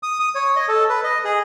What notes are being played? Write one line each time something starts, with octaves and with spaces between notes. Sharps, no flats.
D#6
D#6
C#5
D#5
A4
B4
D#5
G#4